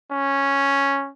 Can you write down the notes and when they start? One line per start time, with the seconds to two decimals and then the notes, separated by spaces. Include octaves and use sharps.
0.12 C#4